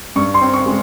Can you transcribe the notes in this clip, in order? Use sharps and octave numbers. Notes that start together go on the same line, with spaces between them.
G2 C#6
C6
C4
C#6
G#3